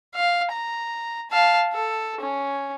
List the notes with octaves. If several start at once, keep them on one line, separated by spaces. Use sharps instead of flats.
F5
A#5
F5 A5
A4
C#4